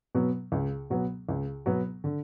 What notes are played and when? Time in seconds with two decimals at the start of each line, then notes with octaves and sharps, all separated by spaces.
0.15 B2 F#3 B3
0.52 C#2
0.90 B2 F#3 B3
1.29 C#2
1.66 B2 F#3 B3
2.04 D3